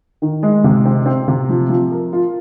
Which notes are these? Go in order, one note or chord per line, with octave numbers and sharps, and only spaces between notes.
D#3
G#3
C3
C4
C4
C3
F3
F3
A#4
F4